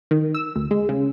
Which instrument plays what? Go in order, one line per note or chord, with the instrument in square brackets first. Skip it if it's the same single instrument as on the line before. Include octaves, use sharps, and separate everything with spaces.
[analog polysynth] D#3
E6
D2
G#3
C#3